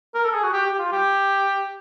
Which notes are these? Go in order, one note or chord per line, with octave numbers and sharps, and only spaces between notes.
A#4
A4
G#4
F#4
G4
G4
F4
G4